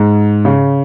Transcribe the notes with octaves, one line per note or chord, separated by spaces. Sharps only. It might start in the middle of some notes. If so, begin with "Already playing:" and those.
Already playing: G#2
C#3